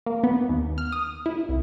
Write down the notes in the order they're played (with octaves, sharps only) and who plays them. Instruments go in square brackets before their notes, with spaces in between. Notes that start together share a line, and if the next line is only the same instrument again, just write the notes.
[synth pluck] A#3
B3
D#2
F6
D#6
E4
C2